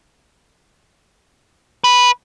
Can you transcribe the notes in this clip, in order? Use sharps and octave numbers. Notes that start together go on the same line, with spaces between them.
B4